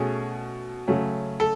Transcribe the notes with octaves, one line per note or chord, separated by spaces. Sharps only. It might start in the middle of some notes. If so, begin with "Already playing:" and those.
Already playing: B2 A3 C#4 G#4
C#3 F#3 A3 C#4
A4